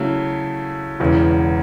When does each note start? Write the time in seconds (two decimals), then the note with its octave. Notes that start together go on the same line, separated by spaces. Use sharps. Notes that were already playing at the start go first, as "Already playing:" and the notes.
Already playing: C#3 F#3 A3 E4
1.00 E1 E2 C#3